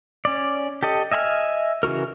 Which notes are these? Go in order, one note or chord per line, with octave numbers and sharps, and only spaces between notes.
C#4 D5
G4 A4 D#5
D#5 E5 G#5 B5 F6
C#3 E3 F#4 A#4